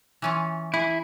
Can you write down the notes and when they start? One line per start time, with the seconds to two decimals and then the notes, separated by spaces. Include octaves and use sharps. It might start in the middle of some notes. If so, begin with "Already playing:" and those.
0.22 E3 C#4 F4
0.74 E4 G#4